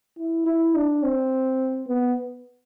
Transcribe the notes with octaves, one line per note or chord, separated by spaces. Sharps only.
E4
E4
D4
C4
B3